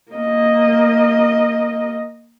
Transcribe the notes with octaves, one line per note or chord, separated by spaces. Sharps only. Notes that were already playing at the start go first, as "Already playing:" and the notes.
A#3 D#5